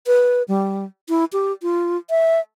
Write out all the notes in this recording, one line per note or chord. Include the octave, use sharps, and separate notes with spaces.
B4
G3
E4
G4
F4
E5